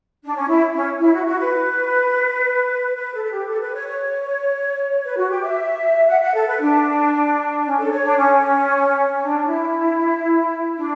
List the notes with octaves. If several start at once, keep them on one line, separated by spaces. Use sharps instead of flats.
D4
C#4
E4
C#4
E4
F#4
F#4
B4
B4
A4
A4
G4
A4
B4
C#5
C#5
B4
F#4
G4
E5
F#5
F#5
A4
B4
D4
C#4
A4
C#5
D4
C#4
D4
E4
D4